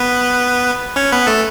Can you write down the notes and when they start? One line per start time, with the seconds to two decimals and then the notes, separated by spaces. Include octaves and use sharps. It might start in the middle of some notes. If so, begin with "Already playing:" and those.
Already playing: B3 B4
0.96 C#4 C#5
1.12 B3 B4
1.27 A3 A4